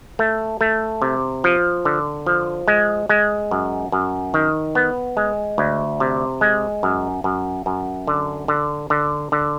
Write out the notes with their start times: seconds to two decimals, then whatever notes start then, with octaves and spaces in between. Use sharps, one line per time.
0.19 A3
0.61 A3
1.02 C3
1.44 F3
1.85 D3
2.26 F3
2.68 G#3
3.09 G#3
3.51 F#2
3.92 F#2
4.34 D#3
4.75 B3
5.17 G#3
5.58 D2
6.00 C3
6.41 G#3
6.83 F#2
7.24 F#2
7.66 F#2
8.07 D3
8.48 D3
8.90 D3
9.32 D3